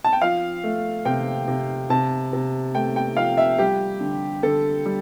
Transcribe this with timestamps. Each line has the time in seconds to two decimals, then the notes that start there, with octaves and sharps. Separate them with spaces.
0.04 A5
0.13 G5
0.22 F3 F5
0.64 A3
1.05 C3 G5
1.48 C3
1.90 C3 A5
2.33 C3
2.75 A3 G5
2.96 G5
3.17 F3 F5
3.37 E5
3.59 G3 G4
4.00 D3
4.43 D3 A4
4.86 G3